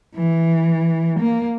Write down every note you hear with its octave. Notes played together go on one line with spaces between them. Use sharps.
E3
A#3